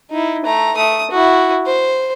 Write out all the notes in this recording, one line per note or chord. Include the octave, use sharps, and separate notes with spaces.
D#4 E4
A3 A#5
A3 D#6
E4 F#4
C5